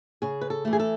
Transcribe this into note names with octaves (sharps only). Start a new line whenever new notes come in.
C#3 G#4
B4
A4
E3 A3
G#4
A4